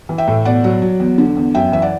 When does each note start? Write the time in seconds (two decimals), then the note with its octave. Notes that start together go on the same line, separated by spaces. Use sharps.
0.09 E3
0.18 E5 G5
0.28 A2
0.45 B2 D5 F#5
0.64 F#3
0.82 F#3
1.00 E2
1.18 D3
1.37 E2
1.55 F#2 E5 G5
1.72 E3 E5
1.82 D5 F#5